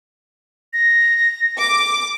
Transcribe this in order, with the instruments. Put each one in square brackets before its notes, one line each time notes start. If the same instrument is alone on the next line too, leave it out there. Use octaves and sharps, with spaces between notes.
[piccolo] A#6
[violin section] D6